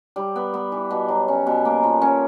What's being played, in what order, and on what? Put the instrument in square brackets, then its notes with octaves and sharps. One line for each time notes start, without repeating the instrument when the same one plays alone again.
[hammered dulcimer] G3
B3
B3
E3
B2
F#3
C#4
B2
A#3
F3
C#4